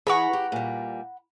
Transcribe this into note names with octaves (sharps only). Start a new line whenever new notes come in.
E3 G#4 F#5 A#5 B5 C#6
G4
A#2 G3